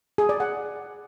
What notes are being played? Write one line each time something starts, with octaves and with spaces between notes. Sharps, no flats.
G#4
D5
F#5